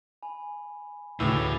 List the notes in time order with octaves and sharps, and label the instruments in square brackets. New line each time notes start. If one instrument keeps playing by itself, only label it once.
[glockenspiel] G#5 B5
[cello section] D2 C#3 [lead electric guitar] A2 [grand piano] E3 E6 [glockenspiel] B5 D6 F7